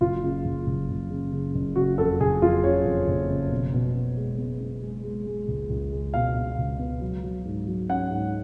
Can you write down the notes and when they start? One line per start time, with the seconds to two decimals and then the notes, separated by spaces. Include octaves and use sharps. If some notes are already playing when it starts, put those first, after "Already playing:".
0.01 F#1 F4
0.23 C#3
0.45 F#1
0.66 F#1
0.89 F#1
1.10 C#3
1.32 C#3
1.55 F#1
1.76 C#3 F#4
1.98 F2 A4
2.20 F#1 G#4
2.42 F2 F4
2.63 C#3 C#5
2.85 F2
3.08 F#1
3.29 C#3
3.51 B2
3.74 B2
3.95 B3
4.17 G#3
4.38 B3
4.61 B3
4.83 G#3
5.04 G#3
5.27 G#3
5.48 C#2
5.70 C#2
5.92 G#3
6.14 B2 F5
6.35 B2
6.58 C#2
6.79 B3
7.01 F#3
7.23 F#3
7.45 G#2
7.67 F#3
7.89 C#4 F#5
8.11 G#2